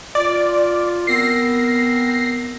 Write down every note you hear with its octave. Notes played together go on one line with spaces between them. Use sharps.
F4 D5
B3 C4 A#4 A#6 C7